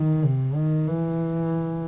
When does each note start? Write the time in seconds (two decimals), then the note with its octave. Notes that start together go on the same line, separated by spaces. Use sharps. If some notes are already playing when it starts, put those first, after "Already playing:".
Already playing: D#3
0.25 C3
0.56 D#3
0.88 E3